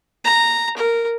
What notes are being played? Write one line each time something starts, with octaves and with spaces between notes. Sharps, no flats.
A#5
A#4